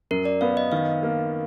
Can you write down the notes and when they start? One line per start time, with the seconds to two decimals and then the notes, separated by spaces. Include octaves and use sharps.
0.11 F#2 A#4
0.25 D5
0.41 B3 F5
0.57 D#5
0.72 D#3 F5
1.03 A#3